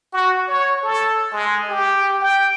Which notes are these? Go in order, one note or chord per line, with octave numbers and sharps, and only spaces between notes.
F#4
C#5
A4
G#3
G4
G5